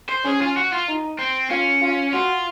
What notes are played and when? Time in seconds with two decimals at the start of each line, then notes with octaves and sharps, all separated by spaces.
0.09 C5
0.25 C#4 G#4
0.41 F4
0.57 F#4
0.72 F4
0.88 D#4
1.19 C4
1.50 C#4 F4
1.81 F4
2.13 F4 F#4